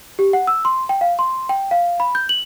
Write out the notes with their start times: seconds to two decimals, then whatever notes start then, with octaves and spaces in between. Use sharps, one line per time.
0.19 G4
0.33 F#5
0.47 E6
0.65 C6
0.89 G5
1.01 F5
1.19 C6
1.49 G5
1.71 F5
2.00 B5
2.15 G6
2.29 F#7